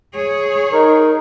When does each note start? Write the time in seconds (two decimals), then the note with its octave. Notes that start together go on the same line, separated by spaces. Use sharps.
0.14 G#4 C#5
0.73 D#4 A#4